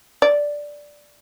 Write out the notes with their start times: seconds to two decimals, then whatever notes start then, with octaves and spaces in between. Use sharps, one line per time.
0.22 D5